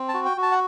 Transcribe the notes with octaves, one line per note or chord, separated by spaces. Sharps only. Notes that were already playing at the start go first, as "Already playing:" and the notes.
Already playing: C4
A5
F#4
G5
F#4
A5
F#5